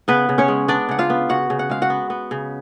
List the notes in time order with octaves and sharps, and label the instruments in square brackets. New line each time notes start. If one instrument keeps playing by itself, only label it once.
[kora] C#3 B3 B4
C#3
C#4 C#5
G#3
B3 D4 D5
C#3 F#5
F4 F5
B3
C#3 F#4 F#5
C#3
F#5
G#3 F5
F#4 F#5
B3
B3
C#3